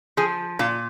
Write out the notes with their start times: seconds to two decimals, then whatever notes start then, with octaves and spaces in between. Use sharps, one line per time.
0.17 F3 G#4
0.59 A#2 F4